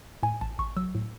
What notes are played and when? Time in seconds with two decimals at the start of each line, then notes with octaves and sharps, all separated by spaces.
0.23 A2 G#5
0.41 A1 A5
0.59 A1 C#6
0.76 F#3 E6
0.95 A2